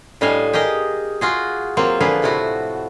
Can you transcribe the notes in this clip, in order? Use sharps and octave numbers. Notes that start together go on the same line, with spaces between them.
A2 G3 D4 D#5 F5 G#5
G4 G#4 A#4 D#5
F4 F#4 G#4
F#3 A#3 C4 F4
D3 F3 A#3 G#4 B4 D5
A2 C3 F3 E4 F#4